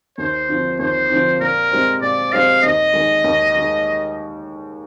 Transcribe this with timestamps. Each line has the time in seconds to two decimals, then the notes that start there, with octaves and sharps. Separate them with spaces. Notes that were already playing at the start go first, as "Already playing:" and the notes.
0.18 D#2 C5
0.49 D3 F3 C4
0.79 D#2 C5
1.10 D3 F3 C4
1.40 A#2 A#4
1.71 G#3 C4 G4 C5
2.01 A#2 D5
2.32 G#3 C4 G4 C5 F5
2.62 D#2 D#5
2.94 D#3 G#3
3.24 D#2
3.54 D#3 G#3